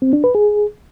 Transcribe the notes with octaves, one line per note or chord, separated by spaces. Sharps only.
C4
D4
B4
G#4